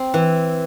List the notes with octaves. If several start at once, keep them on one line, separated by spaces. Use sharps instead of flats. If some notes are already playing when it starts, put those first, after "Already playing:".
Already playing: C4
E3